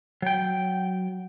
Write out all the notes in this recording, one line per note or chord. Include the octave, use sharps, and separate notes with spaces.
F#3 G5